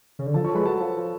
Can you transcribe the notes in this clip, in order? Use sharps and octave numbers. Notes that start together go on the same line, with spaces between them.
C#3
D3
F3 A4 A5
F3 C#5 C#6
G#3 B4 B5
F#3 A4 A5
F3
F3